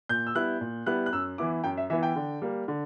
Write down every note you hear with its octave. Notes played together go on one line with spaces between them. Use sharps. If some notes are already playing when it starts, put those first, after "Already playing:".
A#2 G6
E6
G3 B3 E4 F#6
A#2
G3 B3 E4 F#6
F#6
F#2 E6
E3 B3 E4 D6
F#2 G5
E5
E3 B3 E4 E5
G5
D3
G3 A#3
D3